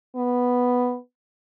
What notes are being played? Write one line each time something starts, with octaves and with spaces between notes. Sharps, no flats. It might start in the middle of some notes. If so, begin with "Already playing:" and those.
B3